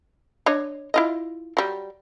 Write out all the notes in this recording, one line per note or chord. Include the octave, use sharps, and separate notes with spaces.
D4 C#5 D#5
E4 F4 D#5
F#3 G3